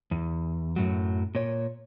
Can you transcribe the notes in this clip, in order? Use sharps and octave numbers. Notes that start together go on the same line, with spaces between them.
E2
F#2 A2 F#3
A#2 C#5